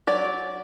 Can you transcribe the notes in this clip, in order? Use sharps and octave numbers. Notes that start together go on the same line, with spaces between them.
F#3 D5